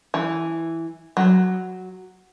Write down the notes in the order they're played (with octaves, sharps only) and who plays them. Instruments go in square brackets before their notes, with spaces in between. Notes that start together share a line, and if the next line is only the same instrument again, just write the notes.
[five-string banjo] E3
F#3